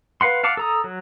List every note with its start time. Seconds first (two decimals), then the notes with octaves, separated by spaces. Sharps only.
0.21 B4 F5 F#5 C6
0.43 F5 F#5 A5 D6
0.57 A4 A#5 D#6
0.84 F#3